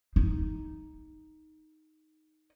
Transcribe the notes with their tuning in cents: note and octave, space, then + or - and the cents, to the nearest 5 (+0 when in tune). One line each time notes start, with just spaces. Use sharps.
D#4 +5